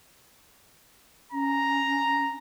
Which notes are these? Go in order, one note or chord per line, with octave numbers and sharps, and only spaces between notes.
C#4 A#5